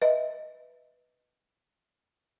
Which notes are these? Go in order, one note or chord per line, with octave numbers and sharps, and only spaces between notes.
B4 D#5 E5